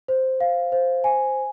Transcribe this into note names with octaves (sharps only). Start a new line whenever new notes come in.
C5
F5
C5
G#5